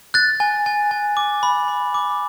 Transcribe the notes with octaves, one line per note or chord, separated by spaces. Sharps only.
F#6 A6
G#5
G#5
G#5
D6
B5
B5
D6